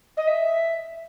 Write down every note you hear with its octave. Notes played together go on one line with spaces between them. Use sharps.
D#5
E5